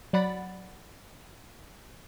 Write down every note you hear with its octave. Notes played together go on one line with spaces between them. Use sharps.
F#3 D5 F#5 B5 A6